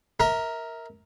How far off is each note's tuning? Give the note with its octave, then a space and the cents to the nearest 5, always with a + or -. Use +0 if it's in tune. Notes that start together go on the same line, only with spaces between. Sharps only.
A#4 +0 E5 -35